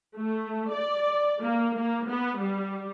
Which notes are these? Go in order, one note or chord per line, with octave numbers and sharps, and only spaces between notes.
A3
D5
A#3
A#3
B3
G3